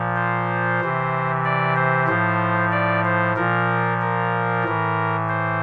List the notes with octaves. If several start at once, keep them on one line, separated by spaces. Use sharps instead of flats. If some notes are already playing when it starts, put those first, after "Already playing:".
Already playing: A#2 F3
C5
C3 E3
D5
C5
A2 F3 C5
D5
C5
A#2 F3 A#4
A#4
A2 E3
C5